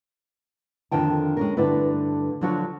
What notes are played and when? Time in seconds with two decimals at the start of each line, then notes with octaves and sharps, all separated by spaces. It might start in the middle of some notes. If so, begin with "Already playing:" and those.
0.91 F2 D3 D#3 G5 A5
1.37 G#3 C#4 A#4
1.57 G2 D3 A3 E4 B4
2.41 D3 F3 F#3 D4 F#4